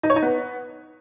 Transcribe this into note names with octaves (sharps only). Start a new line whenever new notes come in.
D#4
C#5
D#4
B3